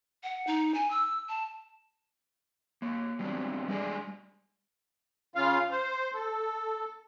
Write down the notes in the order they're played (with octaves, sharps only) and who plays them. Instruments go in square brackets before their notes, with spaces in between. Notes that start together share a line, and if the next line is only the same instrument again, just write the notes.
[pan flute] F#5
D#4
G#5
E6
A5
[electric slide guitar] A#3 C#5
F#3 G3 B3 C4 D4
G3 G#3 D4 G#4 D5 G#5
[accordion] C#3 F4 F5
C5
A4